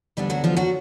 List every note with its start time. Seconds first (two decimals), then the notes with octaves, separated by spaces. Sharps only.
0.17 D2 D3 G3 B3 D4
0.30 F#3 F#4
0.44 F3 F4
0.56 F#3 F#4